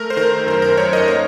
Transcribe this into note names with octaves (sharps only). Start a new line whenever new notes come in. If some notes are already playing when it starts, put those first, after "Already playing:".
Already playing: A3 A#4
C5
D#3 A#4
F#2 C5
A#4
F#2 C#5
D#5
A#3 C#5